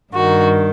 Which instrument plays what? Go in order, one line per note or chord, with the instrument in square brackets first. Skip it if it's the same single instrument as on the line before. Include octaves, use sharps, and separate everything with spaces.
[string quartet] G2 D#3 F#4